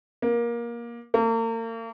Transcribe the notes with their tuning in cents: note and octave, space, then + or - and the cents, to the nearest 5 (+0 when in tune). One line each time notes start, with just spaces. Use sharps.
A#3 +20
A#3 -40